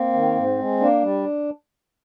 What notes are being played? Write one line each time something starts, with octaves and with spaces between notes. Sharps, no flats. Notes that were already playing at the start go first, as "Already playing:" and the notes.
Already playing: A#3 C4
D#3
G#2
G#3
A#3 D4
G3